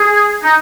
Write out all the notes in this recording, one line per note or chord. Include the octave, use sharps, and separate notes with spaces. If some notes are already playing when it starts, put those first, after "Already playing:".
Already playing: G#4
D#4